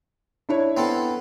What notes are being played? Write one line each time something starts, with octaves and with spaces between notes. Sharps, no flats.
D4 E4 C#5
B3 C4 A4